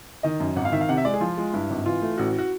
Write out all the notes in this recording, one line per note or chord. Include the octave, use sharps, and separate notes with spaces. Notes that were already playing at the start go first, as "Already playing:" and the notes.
D#3 D#5
F#2
G#1 F#5
F5
D#3 E5
F5
C3 F#5
E5
G#3 D5
G#4
F3 F4
G#3
G2 E4
G#1
E3 F4
A3
A1 F#4
F#4